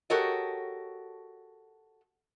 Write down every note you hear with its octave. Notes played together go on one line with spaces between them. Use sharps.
F#4 G4 A4 A#4 C#5 D#5